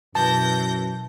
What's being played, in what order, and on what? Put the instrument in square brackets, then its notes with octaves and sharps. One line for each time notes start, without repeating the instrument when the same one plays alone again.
[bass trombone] F#2 [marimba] B2 [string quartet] E3 G6 A#6 [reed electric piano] A5